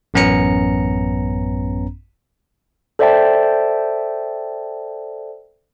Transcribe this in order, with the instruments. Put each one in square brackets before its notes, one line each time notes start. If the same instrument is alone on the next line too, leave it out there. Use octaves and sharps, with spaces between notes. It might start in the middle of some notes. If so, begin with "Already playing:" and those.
[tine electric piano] A1 F#2 B3 C#4 A#5 C#7
[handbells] A4 C5 D5 E5 G5 A5